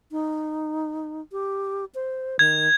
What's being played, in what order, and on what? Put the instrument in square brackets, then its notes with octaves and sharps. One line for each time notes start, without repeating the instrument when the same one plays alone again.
[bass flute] D#4
G4
C5
[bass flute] D#3 [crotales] G#6